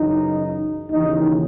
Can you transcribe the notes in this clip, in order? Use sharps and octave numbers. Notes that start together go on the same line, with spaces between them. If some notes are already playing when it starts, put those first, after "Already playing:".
Already playing: F#2 C#3 E3 D#4
D#2 C#3 E3 D#4